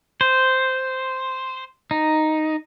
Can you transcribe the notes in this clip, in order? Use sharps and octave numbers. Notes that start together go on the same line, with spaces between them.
C5
D#4